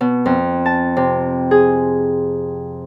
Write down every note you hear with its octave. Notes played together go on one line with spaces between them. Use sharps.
B2
F2
A5
C3
G#4